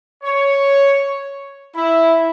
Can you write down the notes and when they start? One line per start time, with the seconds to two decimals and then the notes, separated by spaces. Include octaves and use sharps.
0.23 C#5
1.74 E4